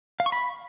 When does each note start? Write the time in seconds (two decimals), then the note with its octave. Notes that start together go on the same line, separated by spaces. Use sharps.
0.20 F5
0.26 C#6
0.32 B5